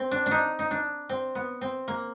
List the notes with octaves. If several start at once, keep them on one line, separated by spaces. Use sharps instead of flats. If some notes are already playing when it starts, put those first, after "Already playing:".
Already playing: C4
D4
D4
D#4
D#4
D4
C4
B3
C4
A#3